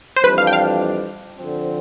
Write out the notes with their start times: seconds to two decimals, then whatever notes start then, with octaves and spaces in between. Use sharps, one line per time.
0.16 C5
0.23 F2 E3 G3 D4 B4
0.38 F5
0.47 G5
0.53 F5
1.37 D3 F3 C4